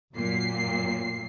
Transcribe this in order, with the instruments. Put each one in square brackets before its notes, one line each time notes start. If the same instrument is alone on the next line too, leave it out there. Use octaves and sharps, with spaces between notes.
[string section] F#2 A#2 F#3 C7